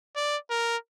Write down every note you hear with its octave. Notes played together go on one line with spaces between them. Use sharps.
D5
A#4